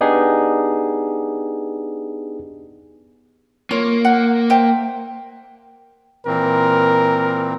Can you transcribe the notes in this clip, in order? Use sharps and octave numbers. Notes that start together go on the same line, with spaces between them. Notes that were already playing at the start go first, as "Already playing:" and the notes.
B3 D4 D#4 G4 G#4
A#3 F4 C#5
F#5
C5 E5 G5
A#2 E3 C4 A#4